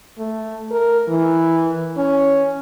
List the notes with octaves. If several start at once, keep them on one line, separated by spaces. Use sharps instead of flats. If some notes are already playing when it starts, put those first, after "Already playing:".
A3
A#4
E3
C#4